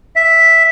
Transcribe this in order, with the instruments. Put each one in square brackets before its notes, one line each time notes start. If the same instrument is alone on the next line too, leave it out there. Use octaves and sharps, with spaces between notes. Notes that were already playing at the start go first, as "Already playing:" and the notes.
[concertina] E5